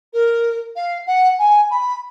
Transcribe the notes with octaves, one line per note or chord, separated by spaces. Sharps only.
A#4
F5
F#5
G#5
B5